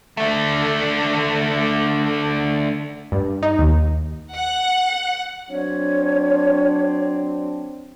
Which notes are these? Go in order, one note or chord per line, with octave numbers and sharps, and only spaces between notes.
D3 A3
G2
D#4
D#2
F#5
F#3 C4 D4 C#5